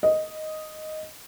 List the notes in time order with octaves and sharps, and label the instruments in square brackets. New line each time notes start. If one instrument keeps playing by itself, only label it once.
[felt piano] D#5